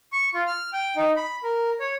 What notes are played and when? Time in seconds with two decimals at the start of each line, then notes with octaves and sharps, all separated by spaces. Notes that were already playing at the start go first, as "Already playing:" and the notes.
0.12 C#6
0.34 F4
0.47 F6
0.73 G5
0.96 D#4
1.16 B5
1.43 A#4
1.80 C#5